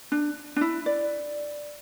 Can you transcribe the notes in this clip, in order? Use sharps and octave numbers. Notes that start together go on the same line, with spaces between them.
D4
D4
E4
D5